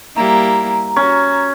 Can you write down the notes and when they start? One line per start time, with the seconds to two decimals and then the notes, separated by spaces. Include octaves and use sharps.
0.17 G3 A#3 E4 A#5
0.96 C#4 F#4